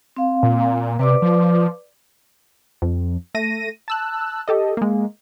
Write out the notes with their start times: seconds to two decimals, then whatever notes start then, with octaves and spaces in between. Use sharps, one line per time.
0.16 C4 F5
0.43 A#2
0.99 C3 B4 D5 D6
1.22 F3
2.82 F2
3.35 A3 A#6 D#7
3.88 A5 E6 F#6
4.48 G4 A4 D#5
4.77 G#3 A#3